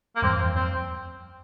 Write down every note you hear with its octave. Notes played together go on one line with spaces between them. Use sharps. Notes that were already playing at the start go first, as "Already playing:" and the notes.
A#3
E2 G2 C4
E2
F2 C4